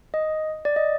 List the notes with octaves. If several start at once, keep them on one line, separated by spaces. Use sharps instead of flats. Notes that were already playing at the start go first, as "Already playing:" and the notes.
D#5
D5
D#5